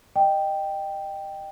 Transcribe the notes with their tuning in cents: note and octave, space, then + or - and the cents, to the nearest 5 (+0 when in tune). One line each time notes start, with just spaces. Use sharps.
D#5 -20 G5 +0